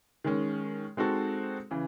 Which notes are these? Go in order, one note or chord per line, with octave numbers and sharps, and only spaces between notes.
D#3 G#3 C#4
G#3 C4 D#4 F#4 A4
C#3 E3